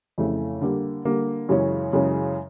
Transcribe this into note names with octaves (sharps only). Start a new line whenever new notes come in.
F2 C#3 E3 A3
D3 G3 A#3
D3 G3 A#3
F#2 C#3 E3 G#3 C#4
F#2 C#3 E3 G#3 C#4